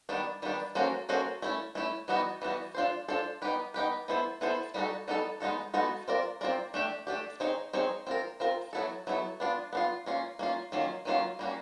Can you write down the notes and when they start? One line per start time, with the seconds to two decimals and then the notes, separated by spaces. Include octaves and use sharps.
0.09 D#3 G3 B3 D4
0.42 D#3 G3 B3 D4
0.75 A#3 C#4 F#4 A4 C5
1.09 A#3 C#4 F#4 A4 C5
1.42 A3 C#4 E4
1.75 A3 C#4 E4
2.08 E3 G3 B3 D#4 F#4
2.42 E3 G3 B3 D#4 F#4
2.75 D4 F4 A4 C5
3.08 D4 F4 A4 C5
3.42 B3 D#4 G4 B4
3.74 B3 D#4 G4 B4
4.08 B3 E4 A4 C5
4.41 B3 E4 A4 C5
4.74 G3 B3 D#4 F#4 A4
5.08 G3 B3 D#4 F#4 A4
5.40 G#3 B3 D#4 F#4 A4
5.74 G#3 B3 D#4 F#4 A4
6.08 C4 F4 A#4 D5
6.41 C4 F4 A#4 D5
6.74 A3 D4 G4
7.07 A3 D4 G4
7.40 C4 D#4 G#4 C#5
7.73 C4 D#4 G#4 C#5
8.07 C4 F4 A#4
8.40 C4 F4 A#4
8.73 F#3 B3 E4 A4
9.07 F#3 B3 E4 A4
9.40 B3 D4 F4
9.73 B3 D4 F4
10.06 A#3 C#4 F4
10.39 A#3 C#4 F4
10.72 D#3 F#3 A#3 C#4 F4
11.05 D#3 F#3 A#3 C#4 F4
11.39 G3 A#3 C#4 F#4